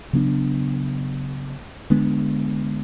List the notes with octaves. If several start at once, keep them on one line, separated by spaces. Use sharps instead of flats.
C#3 F#3 B3 D4
D3 G#3 B3 D4